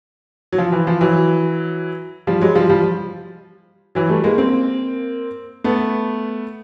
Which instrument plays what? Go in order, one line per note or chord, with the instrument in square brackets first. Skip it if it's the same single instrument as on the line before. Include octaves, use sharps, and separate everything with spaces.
[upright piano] F#3
F3
E3
F3
E3 F#3
F3 G3
F#3 G#3
F3 G3
F3 G3
E3 F#3
G3 A3
G#3 A#3
A#3 C4
A3 B3